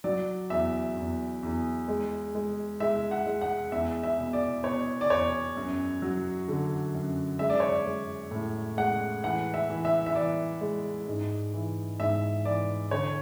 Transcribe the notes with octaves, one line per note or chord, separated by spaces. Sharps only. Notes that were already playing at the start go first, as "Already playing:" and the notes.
F#3 D5
E2 E5
E2
E2
G#3
G#3
G#3 E5
F#5
G#3
F#5
E2 E5
E5
B2
D5
B2 C#5
D5
E2 C#5
F#2
F#3
D3
F#2
G#3 E5
D5
C#5
D5
G#3
A2
G#3 F#5
E3 F#5
E5
E3
E5
E5
E3 D5
G#3
G#2
E3
G#2 E5
E3 D5
D3 C#5